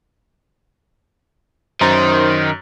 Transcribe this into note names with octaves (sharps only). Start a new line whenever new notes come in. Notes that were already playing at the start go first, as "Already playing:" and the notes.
F#2 D#3 C5 A#5 A6